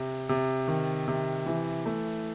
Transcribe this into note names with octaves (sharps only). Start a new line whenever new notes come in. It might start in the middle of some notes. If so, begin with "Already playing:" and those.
Already playing: C3
C3
D#3
C3
E3
A3